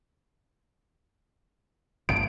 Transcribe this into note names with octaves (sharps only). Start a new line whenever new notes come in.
G1 D2 A2 D7